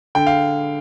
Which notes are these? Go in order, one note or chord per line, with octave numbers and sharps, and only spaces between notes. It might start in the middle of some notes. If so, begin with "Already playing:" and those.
D3 G5
F5